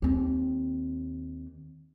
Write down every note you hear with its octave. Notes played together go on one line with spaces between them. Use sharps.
D#2 C4